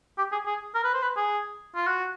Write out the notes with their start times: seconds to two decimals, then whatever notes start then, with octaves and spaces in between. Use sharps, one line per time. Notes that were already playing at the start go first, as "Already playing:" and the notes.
0.18 G4
0.32 G#4
0.46 G#4
0.75 A#4
0.84 B4
0.94 C5
1.02 B4
1.17 G#4
1.76 F4
1.87 F#4